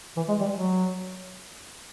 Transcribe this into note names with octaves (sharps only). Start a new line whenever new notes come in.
E3
G#3
G3
F#3